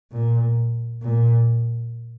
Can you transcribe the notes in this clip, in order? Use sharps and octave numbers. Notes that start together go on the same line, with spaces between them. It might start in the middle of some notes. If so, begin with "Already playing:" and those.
A#2
A#2